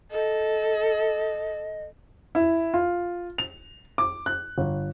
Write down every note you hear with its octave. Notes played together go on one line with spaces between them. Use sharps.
A4 D#5
E4
F4
F7
D6
F#6
G1